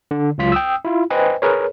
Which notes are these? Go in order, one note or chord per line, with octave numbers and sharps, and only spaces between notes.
D3
C#2 F#3 F4 B6
G5 D#6 E6
E4 F4
B4 C5 D#5 G5 G#5
G#4 A#4 B4 C#5